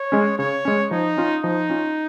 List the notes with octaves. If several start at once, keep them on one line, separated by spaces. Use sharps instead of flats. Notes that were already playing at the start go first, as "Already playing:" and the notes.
Already playing: C#5
G#3 C#4
C#3 C#5
G#3 C#4
F3 D#4
C#4 F4
F3 D#4
C#4 F4